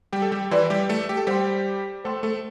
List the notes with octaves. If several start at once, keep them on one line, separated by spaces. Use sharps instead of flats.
G3 G4
A4
G3 G4
E3 E4 B4 D5 A5 C6
G3 G4
A3 A4
G4
A4
G3 G4 C5 G5 C6
A3 A4 C5 G5 C6
A3 A4